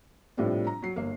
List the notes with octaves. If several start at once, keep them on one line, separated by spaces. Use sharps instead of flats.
A2 C3 F3 G3 D4
A#5
F#3 C7
G1 A#3